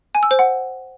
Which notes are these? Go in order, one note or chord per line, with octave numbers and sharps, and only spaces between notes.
G#5
E6
C5
F#5